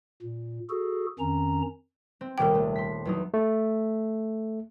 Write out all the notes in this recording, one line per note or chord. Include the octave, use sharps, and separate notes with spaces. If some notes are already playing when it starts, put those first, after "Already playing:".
A#2
F#4 G#4 A4
F2 D#3 C#4 A#5
C4
D#1 C2 A#4 G5 D6
A3
C6 B6
E2 F#3 D#4
A3